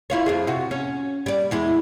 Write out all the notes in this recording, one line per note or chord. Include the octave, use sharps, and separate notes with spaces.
E4 F4 C#5
F2 F3 G#4
C3 F#4
C#4
G3 D5
E2 G#3 E4